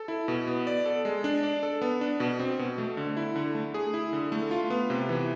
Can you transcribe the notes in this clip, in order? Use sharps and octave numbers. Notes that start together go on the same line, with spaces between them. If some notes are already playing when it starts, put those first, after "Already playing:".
Already playing: A4
E4
B2
B3
D5
A4
G#3
D4
D5
A4
B3
D4
B2
C4
B2
A3
D3
E4
D3
A3
G#4
E4
D3
A3
F4
B3
C3
E3